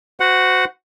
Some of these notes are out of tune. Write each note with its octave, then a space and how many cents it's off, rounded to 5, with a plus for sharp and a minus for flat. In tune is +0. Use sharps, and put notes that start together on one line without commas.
F#4 +0 C5 -30 F#5 +0